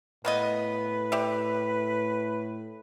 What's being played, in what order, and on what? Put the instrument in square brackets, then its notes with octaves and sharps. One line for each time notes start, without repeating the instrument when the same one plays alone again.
[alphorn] A2 [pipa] A#3 B3 D#5 [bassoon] B4
[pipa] G4 D5 E5